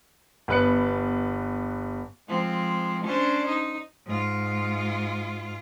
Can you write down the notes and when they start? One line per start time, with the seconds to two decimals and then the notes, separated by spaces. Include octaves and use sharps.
0.48 G1 B3 B4 F#6 C#7
2.28 F3 G#3 C4
3.04 C#4 D4 C5
3.47 D#4
4.06 G#2 F4